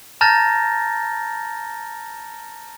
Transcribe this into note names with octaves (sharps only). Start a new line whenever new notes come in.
A5 A#5 F6 G6 A6 A#6